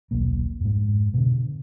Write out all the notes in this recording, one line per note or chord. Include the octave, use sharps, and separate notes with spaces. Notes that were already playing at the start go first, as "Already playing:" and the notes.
D#1 B1 A#3
F2 G#2
B2 D3